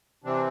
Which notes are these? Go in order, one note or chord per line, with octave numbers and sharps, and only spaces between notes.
C3 E3 C4 D4